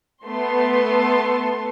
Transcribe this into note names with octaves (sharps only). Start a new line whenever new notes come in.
A3 B3 A4 C6